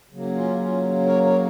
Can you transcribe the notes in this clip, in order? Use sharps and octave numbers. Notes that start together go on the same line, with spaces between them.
C#3 F#3 A#3
C#4 F4
C#4 F4
A#4 C#5
A#4 C#5